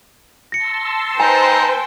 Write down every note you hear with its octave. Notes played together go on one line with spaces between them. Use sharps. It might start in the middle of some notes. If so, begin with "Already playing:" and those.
A5 C6 E6 A#6 C#7
D#4 B4 C5 G5 G#5